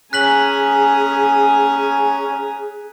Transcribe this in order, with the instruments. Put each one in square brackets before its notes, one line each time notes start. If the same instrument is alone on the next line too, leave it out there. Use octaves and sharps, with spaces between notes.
[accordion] C#4 [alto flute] G#4 [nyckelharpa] G#5 A#5 [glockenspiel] F#6 B6 F#7